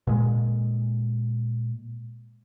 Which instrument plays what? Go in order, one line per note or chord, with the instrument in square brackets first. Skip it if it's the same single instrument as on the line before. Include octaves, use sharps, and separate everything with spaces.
[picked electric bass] A#2 G#3